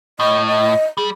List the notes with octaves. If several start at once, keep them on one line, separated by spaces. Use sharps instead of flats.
A2 D#5
D#5
G3 G#4